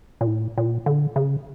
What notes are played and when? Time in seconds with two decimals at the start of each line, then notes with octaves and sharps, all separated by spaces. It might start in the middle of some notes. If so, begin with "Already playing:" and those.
0.21 A#2
0.27 A2
0.58 A#2
0.86 D3
1.16 C#3